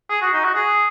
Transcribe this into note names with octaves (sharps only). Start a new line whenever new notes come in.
G#4
F#4
D#4
F#4
G#4